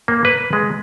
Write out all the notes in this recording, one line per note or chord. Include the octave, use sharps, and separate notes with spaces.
A#3
B4
G#3